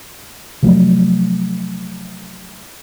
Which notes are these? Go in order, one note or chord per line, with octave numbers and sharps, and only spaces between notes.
C3 F3 F#3 A3